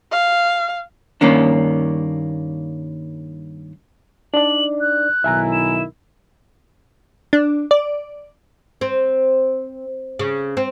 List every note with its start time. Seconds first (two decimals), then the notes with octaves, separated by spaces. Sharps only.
0.12 F5
1.21 G2 D#3 A#3 C#4 D4
4.34 D4 D#4 D5 F#7
4.81 F#6
5.24 B1 D#3 E4 E5 G#5 A#5
5.53 E7
7.33 D4
7.71 D5
8.81 C4
10.19 C#3
10.57 C4